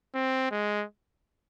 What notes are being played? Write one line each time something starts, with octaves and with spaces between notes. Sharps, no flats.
C4
G#3